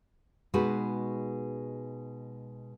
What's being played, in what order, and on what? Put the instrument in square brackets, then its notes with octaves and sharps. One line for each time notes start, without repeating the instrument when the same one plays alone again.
[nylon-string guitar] B2 G#3 D#4 F#4 G#4 B4